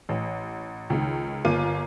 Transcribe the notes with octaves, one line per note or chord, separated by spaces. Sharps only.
A1
C#2 D#3
G1 A#3 F4 D6 D#7